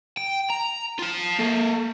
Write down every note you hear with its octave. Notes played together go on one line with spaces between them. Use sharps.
G5
A#5
F4 A5
A#3 A4